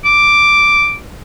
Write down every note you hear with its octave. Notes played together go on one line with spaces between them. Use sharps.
D6